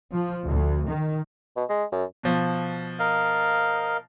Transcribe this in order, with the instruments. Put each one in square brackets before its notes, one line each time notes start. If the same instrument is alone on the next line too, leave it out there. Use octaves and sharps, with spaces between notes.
[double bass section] F3
D2
D#3
[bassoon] B2
G#3
F#2
[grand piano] B2 F3
[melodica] A#4 D#5 F5